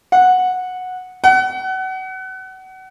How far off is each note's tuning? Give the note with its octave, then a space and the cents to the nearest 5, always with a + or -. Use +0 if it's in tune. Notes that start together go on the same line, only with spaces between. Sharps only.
F#5 -10
F#5 +30